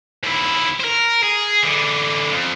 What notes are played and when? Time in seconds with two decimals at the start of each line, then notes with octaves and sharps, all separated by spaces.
0.23 D#2 E4
0.80 A#4 C5
1.23 G#4
1.63 D3 E3
2.31 F2